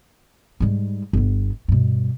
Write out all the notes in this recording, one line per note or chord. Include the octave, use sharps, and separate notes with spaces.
G#2 G3
G1 B3
G2 B2